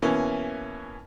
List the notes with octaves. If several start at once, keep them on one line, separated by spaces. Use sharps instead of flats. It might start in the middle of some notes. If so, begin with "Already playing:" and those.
B2 E3 A#3 C#4